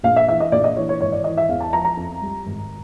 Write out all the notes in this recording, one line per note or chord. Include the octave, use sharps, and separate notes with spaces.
A#1 F5
E5
E3 E5
D#5
A#1 D5
D#5
E3 C#5
C#5
G#1 C#5
D5
E3 D#5
E5
E2 F5
A5
F3 A#5
A#5
F2
G3
G#1